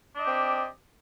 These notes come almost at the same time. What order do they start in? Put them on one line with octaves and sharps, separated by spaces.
D4 D#5 G4 C4